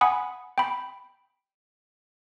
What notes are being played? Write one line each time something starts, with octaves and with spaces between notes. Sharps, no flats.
F#5 G#5 B5 D#6
G5 B5